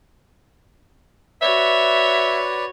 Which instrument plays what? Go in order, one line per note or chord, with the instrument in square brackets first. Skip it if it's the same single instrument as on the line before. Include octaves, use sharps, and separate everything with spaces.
[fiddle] F#4 C#5 [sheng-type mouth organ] B4 D5 [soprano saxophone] E5